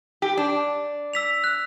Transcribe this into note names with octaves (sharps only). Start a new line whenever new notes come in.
G4
D4
E6 B6 F7
F#6